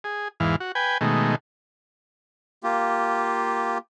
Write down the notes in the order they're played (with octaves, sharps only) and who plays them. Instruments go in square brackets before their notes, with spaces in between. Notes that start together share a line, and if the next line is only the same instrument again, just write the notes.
[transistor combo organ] G#4
E2 G#2 E3 F5
F#4
B4 G5 G#5
B2 D#3 G#3 A3
[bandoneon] A#3 F4 G4